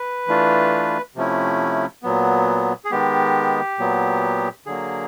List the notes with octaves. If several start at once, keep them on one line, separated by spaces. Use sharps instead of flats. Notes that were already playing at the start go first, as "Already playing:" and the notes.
Already playing: B4
E3 A3 D4 F4
C3 F3 A3 C#4 E4
A#2 F#3 B3
G#4
D#3 G#3 B3 G4
A#2 F#3 B3
D3 F#3 A#3 G#4